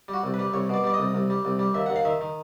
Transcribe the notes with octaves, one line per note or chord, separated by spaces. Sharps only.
G3
F#4
C2
B4
G3
C2 C#5
B2 D5
G3 D5
C2 D#5
C2
G3
C2
G3
D#2 E5
D#2 F#5
F5
D#3 E5
D#3